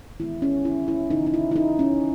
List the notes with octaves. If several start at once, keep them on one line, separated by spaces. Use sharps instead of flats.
D#3 G#3 B3 E4
C#4
E4
E4
C#3 E3 B3 D#4
D#4
E4
E4
D#4
C#4